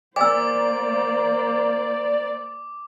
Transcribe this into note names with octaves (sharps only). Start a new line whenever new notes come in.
A#3 C5 D5 G#5 D6 E6